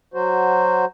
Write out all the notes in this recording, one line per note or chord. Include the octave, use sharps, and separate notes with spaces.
F#3 F#4 C5